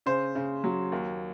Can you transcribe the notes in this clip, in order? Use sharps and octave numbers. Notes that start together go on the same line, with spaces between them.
C#3 C5
C#3
F#3
D#2